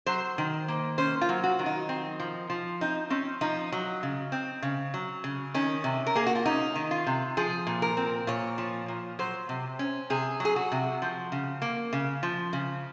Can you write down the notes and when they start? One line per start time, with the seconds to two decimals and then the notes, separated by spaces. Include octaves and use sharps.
0.06 F#3 C5
0.38 D#3
0.68 A#3
0.98 C#4 C5
1.21 F4
1.29 F#3
1.44 F#4
1.59 D#3
1.66 D#4
1.89 C4
2.20 F3
2.50 F3
2.81 C4 D#4
3.10 C4 C#4
3.41 F3 D#4
3.72 F#3
4.03 C#3
4.32 C4
4.62 C#3
4.94 F#3
5.24 C#3
5.54 D#3 C#4
5.84 C3
6.07 A#4
6.16 A#3 G#4
6.26 F#4
6.35 F4
6.46 C#4 D#4
6.75 D#3
6.91 F4
7.07 C3
7.37 F3 G#4
7.67 A#2
7.82 A#4
7.97 C4
8.27 A#2 C#5
8.58 F3
8.88 A#2
9.19 F#3 C5
9.49 C3
9.79 C#4
10.10 C3 G#4
10.40 F#3 G#4
10.56 F#4
10.72 C3
11.02 F3
11.32 C#3
11.62 A#3
11.93 C#3
12.23 F3
12.53 C#3